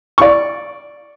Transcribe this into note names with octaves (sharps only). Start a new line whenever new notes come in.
D5 C#6